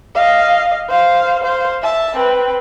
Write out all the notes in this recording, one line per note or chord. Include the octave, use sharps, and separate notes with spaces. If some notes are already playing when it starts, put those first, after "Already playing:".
D#5 F5
C5 F5
C5 F5
E5 A5
C4 B4